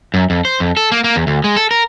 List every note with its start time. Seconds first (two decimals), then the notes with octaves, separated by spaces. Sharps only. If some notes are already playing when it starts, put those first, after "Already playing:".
0.14 F#2
0.30 F2
0.45 C5
0.60 F2
0.77 A4
0.92 A#3
1.04 A#3
1.16 E2
1.27 D2
1.44 G#3
1.56 A4
1.71 A#4